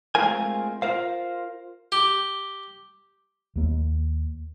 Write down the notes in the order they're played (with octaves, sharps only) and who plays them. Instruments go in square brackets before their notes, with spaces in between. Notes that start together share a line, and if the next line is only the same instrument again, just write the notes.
[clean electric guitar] G#3 A3 C4 F4 A#4 G#5
F4 A#4 C5 F5
[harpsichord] G4
[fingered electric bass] D#2 A#3